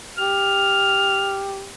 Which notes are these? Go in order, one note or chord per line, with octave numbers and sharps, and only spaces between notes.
G4 F6